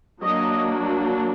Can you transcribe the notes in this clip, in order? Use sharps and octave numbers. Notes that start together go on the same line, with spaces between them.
F#3 A#3 D4 D#5